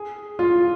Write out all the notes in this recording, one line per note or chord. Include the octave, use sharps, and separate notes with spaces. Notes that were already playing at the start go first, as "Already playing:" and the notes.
Already playing: G#4
F4